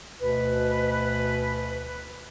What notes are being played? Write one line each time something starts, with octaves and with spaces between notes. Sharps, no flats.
D2 B2 B4